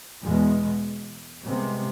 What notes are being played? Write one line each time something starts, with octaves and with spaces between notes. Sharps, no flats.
E2 B2 G#3 B3
C2 C3 G#3 B3